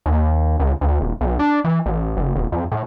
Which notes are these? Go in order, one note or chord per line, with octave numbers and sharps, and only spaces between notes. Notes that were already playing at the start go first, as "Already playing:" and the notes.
D#2
C#2
D2
D#1
B1
D4
E3
A1
F#1
D#1
F2
A2